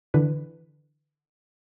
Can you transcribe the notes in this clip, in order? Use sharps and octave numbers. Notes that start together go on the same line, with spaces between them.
D3 E3 B4